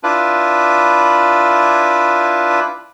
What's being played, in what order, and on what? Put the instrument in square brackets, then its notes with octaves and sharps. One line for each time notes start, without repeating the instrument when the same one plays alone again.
[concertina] D4 E4 F4 B4